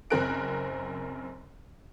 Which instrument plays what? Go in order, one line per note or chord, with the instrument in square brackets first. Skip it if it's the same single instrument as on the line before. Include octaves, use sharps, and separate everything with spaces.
[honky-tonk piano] F#1 F#2 C4 A#4 F#6 D7